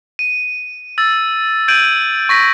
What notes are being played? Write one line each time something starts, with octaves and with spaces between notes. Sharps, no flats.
D#7
E6 A6
G6 G#6 D7 D#7 F#7
C#6 A#6 B6